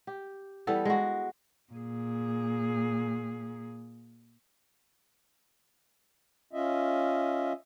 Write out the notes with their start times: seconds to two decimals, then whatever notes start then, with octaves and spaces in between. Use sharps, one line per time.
0.07 G4
0.67 E3 G3 B3 A4
0.85 G#3 F#4
1.72 A#2 G#4
6.53 C#4 F4 D#5 E5